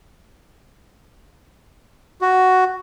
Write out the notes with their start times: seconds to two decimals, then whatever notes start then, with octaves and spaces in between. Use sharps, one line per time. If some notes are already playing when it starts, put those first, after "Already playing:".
2.21 F#4